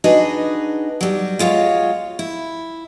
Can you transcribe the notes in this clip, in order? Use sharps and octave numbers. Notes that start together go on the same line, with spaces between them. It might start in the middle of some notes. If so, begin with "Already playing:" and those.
D4 D#4 F#4 G#4 B4 D#5
F#3 G3
G#3 F4 F#4 C#5
E4